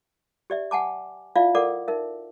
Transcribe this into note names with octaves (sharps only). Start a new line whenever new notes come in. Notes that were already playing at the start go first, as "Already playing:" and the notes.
G4 D5 E5
F#5 G#5 A5 D6
E4 F4 D5 E5 F5
A4 A#4 D5 F#5 D6
D#4 A#4 E5